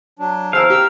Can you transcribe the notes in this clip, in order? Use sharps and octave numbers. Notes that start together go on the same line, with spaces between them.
F#3 D4
E3 G#4 A#4 C5 F5 E6
G4 E6